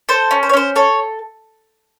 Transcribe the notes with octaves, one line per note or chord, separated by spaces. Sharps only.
A4 C5
C#4
C5
C#5
C#4 C5
A4 C#5